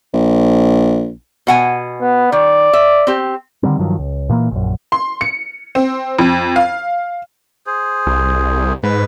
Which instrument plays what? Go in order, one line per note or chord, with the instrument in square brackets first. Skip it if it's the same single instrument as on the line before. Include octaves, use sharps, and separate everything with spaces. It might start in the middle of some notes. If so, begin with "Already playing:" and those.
[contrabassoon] A#1
[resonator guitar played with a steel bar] B2 F#5 G#5
[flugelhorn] B3
[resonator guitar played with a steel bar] D#3 [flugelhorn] D5
[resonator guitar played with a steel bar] E5
C4 G4
[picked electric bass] D3 D#3 G3 C4
G2 D#3 F3 F#3
C#2
A#2 E3 F3 A#3
A#1 F#2
[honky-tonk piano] C6
C#7
C4
F2
F5
[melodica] G#4 C5
[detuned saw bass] C2
[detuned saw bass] G#2 [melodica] B4